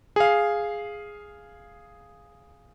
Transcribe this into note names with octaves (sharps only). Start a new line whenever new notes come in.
G#4 F5